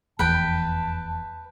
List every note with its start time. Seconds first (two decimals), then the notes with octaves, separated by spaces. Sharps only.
0.19 F1 E2 B4 G5 A5